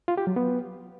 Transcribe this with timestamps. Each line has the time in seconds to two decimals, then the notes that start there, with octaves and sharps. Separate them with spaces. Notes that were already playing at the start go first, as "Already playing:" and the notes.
0.08 F4
0.17 G4
0.27 F#3
0.36 B3